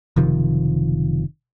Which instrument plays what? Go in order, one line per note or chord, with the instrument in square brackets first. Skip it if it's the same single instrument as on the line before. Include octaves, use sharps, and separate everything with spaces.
[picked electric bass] F#1 C3 D#3 F3